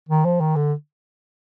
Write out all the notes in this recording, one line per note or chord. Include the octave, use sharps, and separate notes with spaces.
D#3
F3
D#3
D3